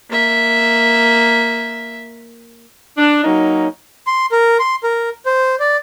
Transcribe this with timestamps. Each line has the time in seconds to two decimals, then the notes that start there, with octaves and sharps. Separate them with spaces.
0.10 A#3 E5
2.98 D4
3.24 F#3 A#3 C#4 D#4
4.07 C6
4.32 A#4
4.59 C6
4.84 A#4
5.26 C5
5.60 D5